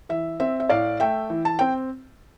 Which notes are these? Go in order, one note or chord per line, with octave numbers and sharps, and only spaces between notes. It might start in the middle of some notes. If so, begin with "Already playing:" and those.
E3 E5
C4 E5
E5
A2 D5 F5
A3 E5 G5
E3
A5
C4 G5